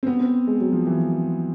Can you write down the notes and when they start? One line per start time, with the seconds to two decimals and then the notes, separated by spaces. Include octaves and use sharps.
0.03 C4
0.07 B3
0.20 C4
0.47 G#3
0.60 F#3
0.73 F3
0.87 E3